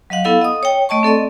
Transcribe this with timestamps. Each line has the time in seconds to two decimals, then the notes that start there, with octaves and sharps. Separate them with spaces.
0.10 F#3 D#5 F5 F#5
0.24 B3 E4 A4 F5 F#5
0.42 D#5 D#6
0.63 C#5 G5
0.89 A3 D#5 A5 C#6
1.03 C4 A4 D5 D#5